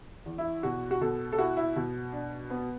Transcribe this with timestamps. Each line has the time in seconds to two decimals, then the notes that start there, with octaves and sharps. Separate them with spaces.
0.26 E2
0.38 E4
0.63 B2 F#4
0.91 F#4
1.01 B2 A4
1.33 A4
1.38 E4 F#4
1.57 E4
1.76 B2
2.12 D4
2.50 B3